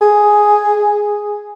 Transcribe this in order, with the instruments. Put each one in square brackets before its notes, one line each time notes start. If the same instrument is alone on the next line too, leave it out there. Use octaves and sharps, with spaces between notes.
[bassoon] G#4